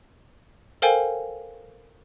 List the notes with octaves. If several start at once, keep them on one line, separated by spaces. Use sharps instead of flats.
A4 A#4 C5 F5 G5 G#5